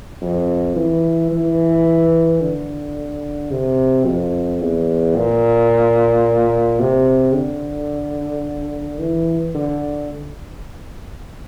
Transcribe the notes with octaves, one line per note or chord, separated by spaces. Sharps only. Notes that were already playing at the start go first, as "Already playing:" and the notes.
F2
E3
E3
D3
C3
F2
E2
A#2
C3
D3
E3
D3